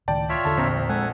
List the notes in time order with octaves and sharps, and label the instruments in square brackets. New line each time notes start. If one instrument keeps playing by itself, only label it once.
[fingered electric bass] C#2 A2 D#3 [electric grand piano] D5 G5 A5
[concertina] F4 C#5 E5
[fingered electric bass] E2 D3 [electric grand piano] A4 A5
[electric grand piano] A#1 C4 A#5
[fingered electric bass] G#3 [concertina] A4 F#5 G#5